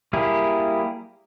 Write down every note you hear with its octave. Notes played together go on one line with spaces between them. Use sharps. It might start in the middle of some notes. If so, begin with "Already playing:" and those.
G3 A#3 E4 G4 G#4